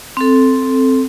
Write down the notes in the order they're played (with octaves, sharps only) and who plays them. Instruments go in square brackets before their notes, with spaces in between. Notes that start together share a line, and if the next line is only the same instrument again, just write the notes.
[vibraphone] C4 A4